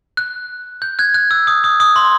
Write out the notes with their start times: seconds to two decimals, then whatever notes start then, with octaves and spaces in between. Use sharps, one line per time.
0.17 F#6
0.82 G6
0.99 F#6 G#6
1.14 F#6
1.31 E6
1.47 D#6
1.64 D#6
1.80 D#6
1.96 C6